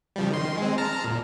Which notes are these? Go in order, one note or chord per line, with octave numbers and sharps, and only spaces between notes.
C#3 F3 G3
D#3 C6
G#3 C4
A5 A#5 F6
A#2